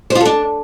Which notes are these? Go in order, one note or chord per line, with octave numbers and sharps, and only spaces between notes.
C5
F4
A4
D4